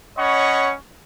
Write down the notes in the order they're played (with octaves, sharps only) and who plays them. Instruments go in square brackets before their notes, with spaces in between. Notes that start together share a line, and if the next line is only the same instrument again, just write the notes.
[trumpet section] C#4 C#5 D#5 F#5 B5 C#6